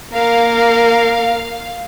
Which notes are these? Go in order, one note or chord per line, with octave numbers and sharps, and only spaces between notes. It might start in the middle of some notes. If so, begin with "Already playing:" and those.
A#3 A#4 F5